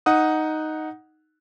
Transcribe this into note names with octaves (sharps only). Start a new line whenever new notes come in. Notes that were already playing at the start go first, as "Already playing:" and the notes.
D#4 F#5 D#6